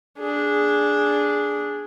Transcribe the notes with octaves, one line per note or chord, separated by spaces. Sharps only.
D4 G#4